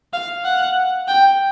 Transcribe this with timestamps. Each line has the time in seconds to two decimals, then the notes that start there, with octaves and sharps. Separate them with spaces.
0.13 F5
0.45 F#5
1.08 G5